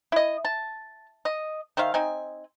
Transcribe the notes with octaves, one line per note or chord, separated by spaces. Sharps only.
E4 D#5
A5
D#5
D#3 C5 E5 F5
C4 D#4 G#5